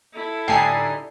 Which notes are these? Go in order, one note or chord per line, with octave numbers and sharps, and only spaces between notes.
E4 A4
A2 D3 G3 D#4 G5 G#5 C7